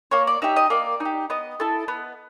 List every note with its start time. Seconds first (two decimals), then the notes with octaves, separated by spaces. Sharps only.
0.11 A#3 C#5
0.27 D5
0.42 D#4 G4 E5
0.56 D#5
0.70 A#3 D5
1.00 D#4
1.05 G4
1.30 B3 D#5
1.60 E4 A4
1.88 B3